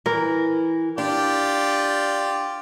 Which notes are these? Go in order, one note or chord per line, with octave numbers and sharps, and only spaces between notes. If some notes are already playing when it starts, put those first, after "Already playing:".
E3 A#4
D4 F4 G4 D5